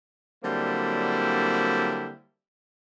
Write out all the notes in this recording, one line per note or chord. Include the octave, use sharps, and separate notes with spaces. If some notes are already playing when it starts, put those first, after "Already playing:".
D3 F#3 G3 A#3 C4 E4